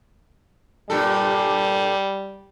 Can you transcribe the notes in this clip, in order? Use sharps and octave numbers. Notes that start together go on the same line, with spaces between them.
G2 A#2 G3 A4